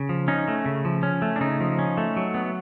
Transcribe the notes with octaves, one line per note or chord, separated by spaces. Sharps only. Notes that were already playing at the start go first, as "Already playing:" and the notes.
Already playing: C#3
F3
C#4 D#4
A3
C#3
F3
C#4
A3
D4
C#3 D#4
F3
C#4
A3
F#3
B3